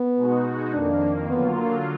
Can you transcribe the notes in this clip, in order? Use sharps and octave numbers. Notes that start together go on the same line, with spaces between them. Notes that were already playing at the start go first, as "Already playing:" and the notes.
Already playing: B3
B2 G#3 D#4 F#4
F2 D#3 A#3 D4
D3 F#3 A#3 B3 F4
A#3